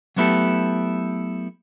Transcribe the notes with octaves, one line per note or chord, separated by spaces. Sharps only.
F#3 A3 B3 E4 G4 A4